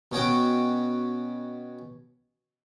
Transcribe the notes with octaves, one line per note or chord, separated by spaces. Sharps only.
B2 C#4 F#4 G5